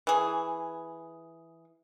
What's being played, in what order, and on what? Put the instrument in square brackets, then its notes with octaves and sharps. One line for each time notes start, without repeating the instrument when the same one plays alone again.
[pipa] E3 G#4